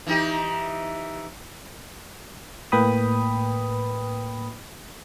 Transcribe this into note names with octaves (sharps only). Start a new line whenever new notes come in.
E3 D#4 G4
A2 A#3 B4 G5 B5 D#6